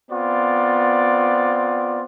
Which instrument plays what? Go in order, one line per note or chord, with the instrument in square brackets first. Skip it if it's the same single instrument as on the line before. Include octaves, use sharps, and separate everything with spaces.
[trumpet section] B3 C4 F4 D5